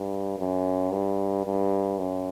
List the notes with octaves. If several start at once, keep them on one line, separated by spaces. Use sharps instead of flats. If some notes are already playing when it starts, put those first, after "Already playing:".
Already playing: G2
F#2
G2
G2
F#2